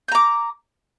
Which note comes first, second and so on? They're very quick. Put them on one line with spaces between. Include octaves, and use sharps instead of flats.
G6 A#5 D6